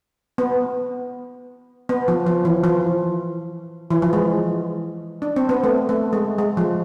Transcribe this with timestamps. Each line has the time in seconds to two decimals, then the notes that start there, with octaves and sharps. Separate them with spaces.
0.38 B3
1.89 B3
2.08 F3
2.26 F3
2.45 E3
2.64 F3
3.90 E3
4.02 F3
4.13 G#3
5.22 D4
5.36 C4
5.49 B3
5.64 A3
5.89 A3
6.13 G#3
6.38 G#3
6.57 F3